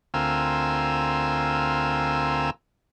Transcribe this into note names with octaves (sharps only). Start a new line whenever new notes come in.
D2 C4 F4 A#4 G#5 E6